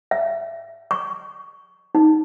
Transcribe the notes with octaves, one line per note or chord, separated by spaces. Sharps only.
E5
C#6
D#4